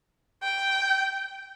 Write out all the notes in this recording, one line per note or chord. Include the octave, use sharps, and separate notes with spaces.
G5